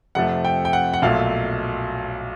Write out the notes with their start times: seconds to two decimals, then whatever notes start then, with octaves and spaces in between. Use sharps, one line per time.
0.15 F2 C3 F3 A3 F#5
0.45 G5
0.65 G5
0.73 F#5
0.93 F#5
1.02 B1 A#2 F#3 A3 F5